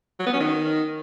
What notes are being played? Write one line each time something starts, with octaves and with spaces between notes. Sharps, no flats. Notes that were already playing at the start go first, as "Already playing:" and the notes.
F#3
B3
C#4
D#3